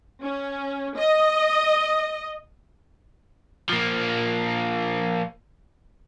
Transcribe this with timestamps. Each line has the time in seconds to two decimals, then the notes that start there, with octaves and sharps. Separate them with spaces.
0.22 C#4
0.96 D#5
3.69 F3 A#3